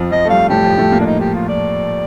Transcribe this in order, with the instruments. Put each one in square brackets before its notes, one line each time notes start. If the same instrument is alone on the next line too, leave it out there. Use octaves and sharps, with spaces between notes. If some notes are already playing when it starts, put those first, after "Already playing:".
Already playing: [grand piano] F2 F3
[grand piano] F2 F3 [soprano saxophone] D#5
[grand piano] A3
[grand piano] G2 G3 [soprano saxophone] F5
[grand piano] A2 A3 [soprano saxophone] G4
[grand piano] F2 F3
A2 A3
A#2 A#3
[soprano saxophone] D4
D#4
G4
F4
D5